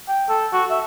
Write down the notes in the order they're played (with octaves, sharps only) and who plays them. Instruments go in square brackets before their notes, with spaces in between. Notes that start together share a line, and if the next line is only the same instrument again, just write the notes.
[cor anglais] G5
A4
F#4
E5